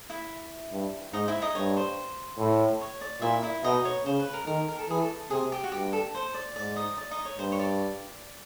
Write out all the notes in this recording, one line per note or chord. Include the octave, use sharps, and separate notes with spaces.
E4 E5
G2
G#2 D#4 D#5
E4 E5
D#4 D#5
G2 C#5
C5
A2
C#5
D5
A#2 E4 E5
E4 E5
B2 D#4 D#5
C#5
C#3 C5
B4
A#4
D#3 A#4
A#4
A4
E3 G#4
A4
C3 G#4
G4
F#4
G2 G4
A4
C5
D5
G#2 D5
D#4 D#5
D5
D#4 D#5
C#5
G2 C5
C#5
D5